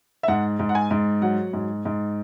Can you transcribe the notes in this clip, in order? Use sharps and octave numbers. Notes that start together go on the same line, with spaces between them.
E5
G#2 F#5
G#2
F#5
G#5
G#2
F#3 F#5
G#2
G#2